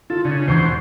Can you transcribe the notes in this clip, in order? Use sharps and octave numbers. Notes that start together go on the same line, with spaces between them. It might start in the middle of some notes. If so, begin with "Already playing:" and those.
F4 A4
C#3 D4
E1 E2 C5 C#6 G#6